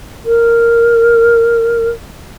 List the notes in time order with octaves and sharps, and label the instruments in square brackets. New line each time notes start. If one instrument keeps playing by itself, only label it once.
[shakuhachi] A#4